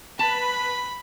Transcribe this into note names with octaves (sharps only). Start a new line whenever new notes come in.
B4 A5 B5